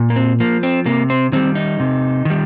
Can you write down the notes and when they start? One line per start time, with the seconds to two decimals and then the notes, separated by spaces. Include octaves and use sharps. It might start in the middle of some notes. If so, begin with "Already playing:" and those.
Already playing: A#2
0.10 A#3
0.16 C4
0.40 F3 A#3
0.63 C4
0.86 C3 A#3
1.10 C4
1.32 D#3 G3 C4
1.55 D#4
1.80 C3
2.25 D#3 G3